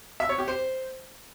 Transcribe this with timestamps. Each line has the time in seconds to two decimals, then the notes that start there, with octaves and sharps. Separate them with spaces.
0.20 E5
0.29 C#5
0.38 G4
0.48 C5